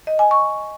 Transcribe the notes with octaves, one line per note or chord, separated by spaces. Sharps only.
D#5
G#5
C#6